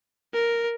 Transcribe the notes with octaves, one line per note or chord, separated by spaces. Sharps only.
A#4